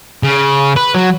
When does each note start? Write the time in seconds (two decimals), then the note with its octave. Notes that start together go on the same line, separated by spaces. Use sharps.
0.23 C#3
0.76 B4
0.94 F#3